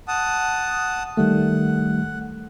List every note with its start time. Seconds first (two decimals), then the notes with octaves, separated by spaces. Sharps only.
0.08 F#5 A5 D#6
1.17 D#3 G3 A3 F#5